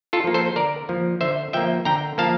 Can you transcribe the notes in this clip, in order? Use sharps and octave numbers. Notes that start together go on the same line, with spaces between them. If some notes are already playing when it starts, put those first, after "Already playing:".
F4 A4
F3 A#3
A4 C5
D3 A#4 D5
F3 A#3
D3 C5 E5
F3 A#3 E5 G5
D3 G5 A#5
F3 A#3 F5 A5